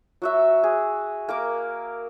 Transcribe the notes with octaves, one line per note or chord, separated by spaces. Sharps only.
F#3 F#4 E5
G#4
A#3 A#4 D6